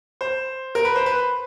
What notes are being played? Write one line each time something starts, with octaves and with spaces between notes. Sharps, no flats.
C5
A#4
B4
C5
B4